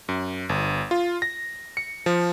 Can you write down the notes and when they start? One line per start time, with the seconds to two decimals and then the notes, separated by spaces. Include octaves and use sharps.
0.09 F#2
0.49 G1
0.91 F4
1.22 A#6
1.77 C#7
2.06 F3